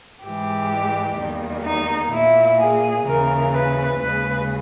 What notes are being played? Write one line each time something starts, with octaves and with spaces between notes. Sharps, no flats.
G#2 E3 G#3 G4
E2 D#3 G3 A#3
D#4
A#2 A#3 E4
G#4
D#2 C#3 E3 A#4
B4
D#2 C#3 G#3 B4